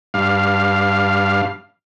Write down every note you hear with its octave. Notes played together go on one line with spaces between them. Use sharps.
G2 F5